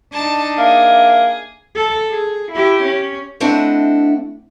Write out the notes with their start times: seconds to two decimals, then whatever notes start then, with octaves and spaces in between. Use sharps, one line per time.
0.13 D4 D#4 A5
0.58 A#3 G#4 E5
1.75 A4
2.10 G#4
2.52 E4 G4
2.83 C#4
3.40 A3 C4 D4 E4 D#5 F#5